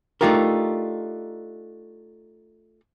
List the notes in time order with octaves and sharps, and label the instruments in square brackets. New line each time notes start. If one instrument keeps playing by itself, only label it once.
[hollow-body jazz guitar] A3 D4 D#4 F4 G4 A#4